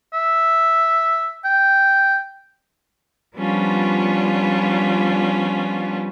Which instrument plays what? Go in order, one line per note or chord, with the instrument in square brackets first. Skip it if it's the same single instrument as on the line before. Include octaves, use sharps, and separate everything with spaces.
[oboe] E5
G5
[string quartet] F3 G3 B3 C#4 D4 F4